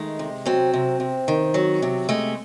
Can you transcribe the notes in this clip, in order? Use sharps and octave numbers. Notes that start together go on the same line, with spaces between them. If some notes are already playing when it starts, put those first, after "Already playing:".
Already playing: D#3 G#3 A3
C3
F#3 C4
C3
C3
D#3
F#3
C3
G#3 A3